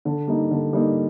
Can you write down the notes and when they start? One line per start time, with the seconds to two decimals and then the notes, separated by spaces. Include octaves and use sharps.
0.05 D3
0.27 G3 A#3 D#4
0.51 D3
0.73 G3 A#3 D#4